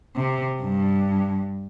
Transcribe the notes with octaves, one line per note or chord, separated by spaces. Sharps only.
C3
G2